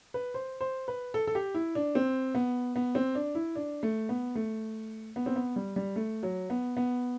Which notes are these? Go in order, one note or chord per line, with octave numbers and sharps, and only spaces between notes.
B4
C5
C5
B4
A4
A4
G4
E4
D4
C4
B3
B3
C4
D4
E4
D4
A3
B3
A3
B3
C4
B3
G3
G3
A3
F#3
B3
B3